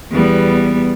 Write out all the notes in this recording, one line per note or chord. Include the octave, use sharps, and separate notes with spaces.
E2 G3 B3